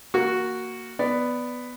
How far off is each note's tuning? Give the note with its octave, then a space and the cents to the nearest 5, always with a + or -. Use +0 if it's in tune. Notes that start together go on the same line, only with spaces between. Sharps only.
A#3 -5 F#4 +0
B3 +5 D5 +0